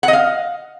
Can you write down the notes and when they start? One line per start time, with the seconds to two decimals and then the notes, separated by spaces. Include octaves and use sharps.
0.03 F#5
0.08 D#5
0.13 F5